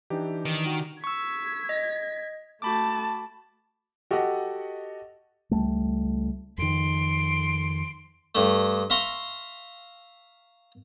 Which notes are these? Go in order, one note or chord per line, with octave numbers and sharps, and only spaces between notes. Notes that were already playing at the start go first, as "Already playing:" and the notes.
E3 D4 D#4 G4
D#3
F#4
C#6 E6 G#6 B6
D#5
A3 F#4 A5 B5 D6
F#4 G4 A4 D#5 F#5
C#2 G3 A3
F2 D#3 C6 D7
G2 A3
E5 F5 A#5 C6 C#6